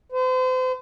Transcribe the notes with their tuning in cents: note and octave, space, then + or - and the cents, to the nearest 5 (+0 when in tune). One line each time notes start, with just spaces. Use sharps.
C5 -40